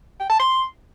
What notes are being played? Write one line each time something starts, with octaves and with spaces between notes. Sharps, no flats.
G5
A5
C6